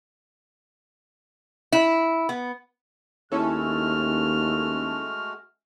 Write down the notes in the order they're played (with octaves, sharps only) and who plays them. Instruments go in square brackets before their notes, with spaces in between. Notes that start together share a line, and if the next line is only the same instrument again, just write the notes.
[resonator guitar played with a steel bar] E4
B3
[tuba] D#2 [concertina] G#3 A3 F#4 [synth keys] C#4 E4 A4 [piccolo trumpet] F6